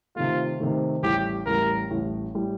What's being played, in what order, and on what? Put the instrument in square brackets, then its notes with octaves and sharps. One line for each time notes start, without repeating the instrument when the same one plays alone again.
[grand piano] C3 D#3 A3 [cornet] F4
[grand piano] C3 D#3 A3
[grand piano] A1 A2 G3 [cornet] G4
[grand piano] A1 A2 G3 [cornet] A#4
[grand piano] A1 A2 G3
A2 G3